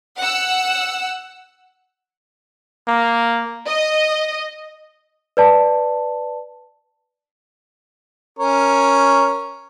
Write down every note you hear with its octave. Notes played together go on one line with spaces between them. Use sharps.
F#5 E6
A#3
D#5
B4 D5 A5
C#4 A#4 C#5